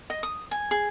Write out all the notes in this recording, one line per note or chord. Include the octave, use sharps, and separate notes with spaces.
D#5
D#6
G#5
G#4